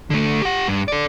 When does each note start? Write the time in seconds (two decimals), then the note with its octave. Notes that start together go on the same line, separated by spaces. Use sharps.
0.10 D3 A3
0.42 G4 F#5
0.67 G2
0.88 A4 D5